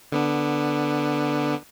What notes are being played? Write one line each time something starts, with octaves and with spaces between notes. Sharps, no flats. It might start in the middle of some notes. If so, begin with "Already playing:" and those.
D3 B3 D4